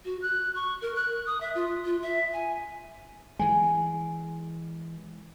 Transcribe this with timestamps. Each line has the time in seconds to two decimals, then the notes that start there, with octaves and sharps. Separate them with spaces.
0.05 F#4
0.22 F#6
0.55 C#6
0.82 A#4
0.96 F#6
1.26 D#6
1.41 E5
1.55 F4
1.85 F4
2.02 E5
2.33 G#5
3.39 E3 G#3 G#5